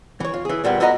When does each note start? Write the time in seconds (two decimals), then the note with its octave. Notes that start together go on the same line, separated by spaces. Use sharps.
0.20 E3 C#5
0.34 F4
0.45 E3 G#4
0.64 D2 A#2 G3 B3
0.80 A3 B3 F4 F#4 D#5 A#5